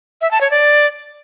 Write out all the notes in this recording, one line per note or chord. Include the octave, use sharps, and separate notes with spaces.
E5
A5
C#5
D5